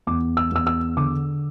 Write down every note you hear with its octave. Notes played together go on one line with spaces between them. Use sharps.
E2 D6
E6
E2 E6
E6
D3 D6